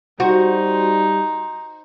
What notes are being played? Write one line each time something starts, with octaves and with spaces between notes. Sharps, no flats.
G3 D#4 F#4 C5